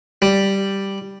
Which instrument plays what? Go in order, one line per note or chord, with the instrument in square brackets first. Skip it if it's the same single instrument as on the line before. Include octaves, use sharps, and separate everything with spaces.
[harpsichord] G3